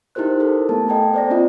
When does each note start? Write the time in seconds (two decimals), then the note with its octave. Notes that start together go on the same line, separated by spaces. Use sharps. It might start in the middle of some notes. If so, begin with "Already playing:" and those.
0.15 D#4 E4 G4 A#4 C5 F#6
0.40 A4 A#4
0.69 A3 B3 A5
0.88 A4 D#5 G5 G#5 A#5
1.14 C5 D5 A#6
1.30 A#3 C4 C#4 E4 F4 D#5